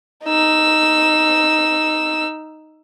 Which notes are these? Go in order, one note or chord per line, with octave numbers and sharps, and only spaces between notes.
D#4 E6